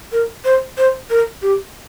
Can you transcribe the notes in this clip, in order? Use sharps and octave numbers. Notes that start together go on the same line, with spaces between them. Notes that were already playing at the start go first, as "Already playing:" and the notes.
A#4
C5
C5
A#4
G4